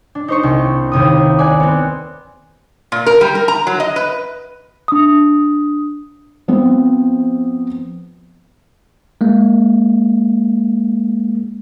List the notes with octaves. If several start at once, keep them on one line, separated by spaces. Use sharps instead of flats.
D4
D#4 C5 C#6
C2
D#2 C3 D#6
D5 G#5 F#6
B3 C4
A#2
A#4
G3
A#4
A#5
F#3
D#5
B4
D4 D#6
F3 B3 C4
G#3 A#3